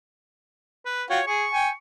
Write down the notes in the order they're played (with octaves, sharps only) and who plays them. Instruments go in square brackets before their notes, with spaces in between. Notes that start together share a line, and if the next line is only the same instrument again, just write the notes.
[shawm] B4
[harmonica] F4 F#4 G5 [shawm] C#5
[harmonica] G#4 [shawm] C#6
[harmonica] G5 G#5